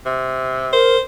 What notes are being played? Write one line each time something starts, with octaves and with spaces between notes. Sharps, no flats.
C3
A#4 C5